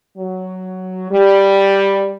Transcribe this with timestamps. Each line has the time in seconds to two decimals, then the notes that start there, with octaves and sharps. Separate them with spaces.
0.18 F#3
1.11 G3